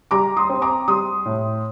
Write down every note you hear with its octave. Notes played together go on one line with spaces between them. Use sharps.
G3 A#5 D6
C6 D#6
C4
A#5 D6
G3 C6 D#6
A2